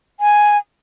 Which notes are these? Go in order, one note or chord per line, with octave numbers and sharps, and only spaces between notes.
G#5